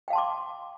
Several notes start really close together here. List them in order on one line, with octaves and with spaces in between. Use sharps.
G5 F5 A5 C6 D6